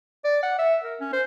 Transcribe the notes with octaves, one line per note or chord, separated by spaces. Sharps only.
D5
F#5
E5
A#4
C#4
C5